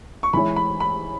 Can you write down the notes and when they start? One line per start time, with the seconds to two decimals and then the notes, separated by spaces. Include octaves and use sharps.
0.23 C#6
0.33 E3 G#3 E4 C#5 B5
0.56 B5
0.80 B5